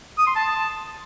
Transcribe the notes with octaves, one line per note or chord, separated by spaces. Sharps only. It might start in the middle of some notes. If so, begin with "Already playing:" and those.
D#6
C6
A5